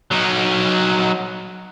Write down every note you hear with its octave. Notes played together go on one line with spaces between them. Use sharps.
F#3 D#4